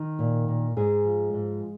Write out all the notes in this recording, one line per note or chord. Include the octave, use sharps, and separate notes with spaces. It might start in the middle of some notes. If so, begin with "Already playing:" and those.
Already playing: D#3 D#4
A#2
A#2
G#2 G#3 G#4
F3
G#2